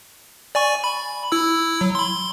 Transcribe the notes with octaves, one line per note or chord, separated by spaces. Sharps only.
D5 G#5 C#6
B5
E4 E6
F#3
B5 C6